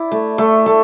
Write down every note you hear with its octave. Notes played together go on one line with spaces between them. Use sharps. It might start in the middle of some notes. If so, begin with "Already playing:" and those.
Already playing: E4 D5
A3
A3
A3